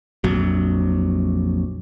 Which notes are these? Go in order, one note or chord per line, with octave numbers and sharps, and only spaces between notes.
A#1 F2 F#3